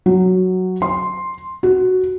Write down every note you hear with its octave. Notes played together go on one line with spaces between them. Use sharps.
F#3
C6
F#4